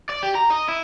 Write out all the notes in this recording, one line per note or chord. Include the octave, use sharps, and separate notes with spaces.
D5
G4
A#5
D#5
E4